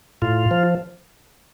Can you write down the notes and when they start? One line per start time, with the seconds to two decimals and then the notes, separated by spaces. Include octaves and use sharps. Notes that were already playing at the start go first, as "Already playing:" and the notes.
0.22 A2 F4
0.51 F3